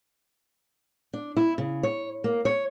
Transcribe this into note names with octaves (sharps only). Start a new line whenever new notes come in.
D4
E4
C#3
C#5
A#3
C#5